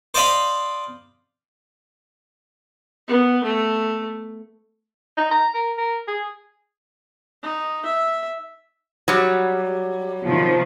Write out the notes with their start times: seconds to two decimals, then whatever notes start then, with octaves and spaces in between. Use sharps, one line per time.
0.14 C5 D5 D#5 F5 B5
3.08 B3
3.44 A3
5.17 D#4
5.31 A#5
5.54 A#4
5.78 A#4
6.08 G#4
7.43 D#4
7.85 E5
9.08 F#3 G3
10.25 C3 D#3 F3